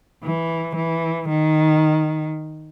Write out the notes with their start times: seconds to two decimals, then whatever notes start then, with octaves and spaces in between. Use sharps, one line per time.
0.24 E3
0.76 E3
1.29 D#3